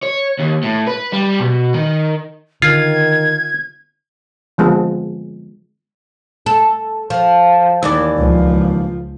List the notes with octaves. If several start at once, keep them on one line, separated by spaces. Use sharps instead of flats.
C#5
D#2
A2
B4
G3
B2
D#3
D3 D#3 F4 G#6
D3 F3 G#3 B3
A4
F3
D#2 E3 D5
C#2 F3